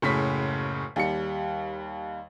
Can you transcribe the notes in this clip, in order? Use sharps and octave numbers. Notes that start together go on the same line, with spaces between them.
F#1 A2 C#3 B6
D#2 G3 C#7